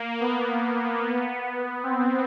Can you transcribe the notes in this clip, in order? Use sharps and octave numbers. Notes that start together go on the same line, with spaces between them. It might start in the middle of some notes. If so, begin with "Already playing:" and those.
Already playing: A#3
B3
C4